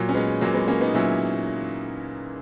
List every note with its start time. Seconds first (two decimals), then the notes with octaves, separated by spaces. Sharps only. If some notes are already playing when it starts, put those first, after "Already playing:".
Already playing: A#2 F#3
0.09 C#4
0.14 G#3 B3
0.41 A#2 F#3 A#3
0.54 G#3 B3
0.68 A#3 C#4
0.81 B3 D#4
0.94 A#2 F#3 C#4 E4